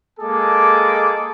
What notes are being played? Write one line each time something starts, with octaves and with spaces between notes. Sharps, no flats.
G#3 A#3 G#4 A4 D6